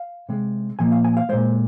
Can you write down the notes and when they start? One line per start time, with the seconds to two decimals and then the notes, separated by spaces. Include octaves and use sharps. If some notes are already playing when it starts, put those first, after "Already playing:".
Already playing: F5
0.29 C3 G#3
0.79 A#2 F3 A#3 G#5
0.92 F5
1.04 G#5
1.17 F5
1.29 A#2 G#3 C5